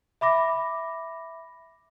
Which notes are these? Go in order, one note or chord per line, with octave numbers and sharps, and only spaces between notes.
E5 B5 D6 A#6